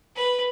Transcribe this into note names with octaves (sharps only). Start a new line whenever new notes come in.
B4